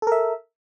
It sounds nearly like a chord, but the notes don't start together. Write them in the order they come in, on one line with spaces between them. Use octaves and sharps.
A4 A#4 E5